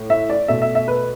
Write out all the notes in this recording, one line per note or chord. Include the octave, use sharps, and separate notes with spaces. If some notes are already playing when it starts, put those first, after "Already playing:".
Already playing: A2 A3
E5
D5
B2 A3 E5
E5
E5
B4